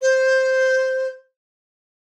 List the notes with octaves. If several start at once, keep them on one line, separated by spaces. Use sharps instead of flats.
C5